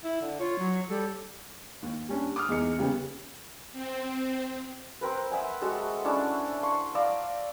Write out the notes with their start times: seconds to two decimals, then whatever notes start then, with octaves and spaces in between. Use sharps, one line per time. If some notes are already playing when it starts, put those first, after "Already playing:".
0.04 E4
0.21 D3
0.39 F4 C#5
0.59 F#3
0.89 G3 A4
1.82 D#2
2.09 G3 C#4 D4
2.36 D6 D#6 F6
2.49 E2 G#3 D#4 C#7
2.78 C#3 G3 A#3 B3 C#4
3.73 C4
5.01 C4 A#4 B4
5.31 E5 F#5 G#5
5.61 G#3 F#4 A4
6.05 C#4 D4 E4 A5
6.63 C6 C#6
6.95 D5 F5 A#5 E6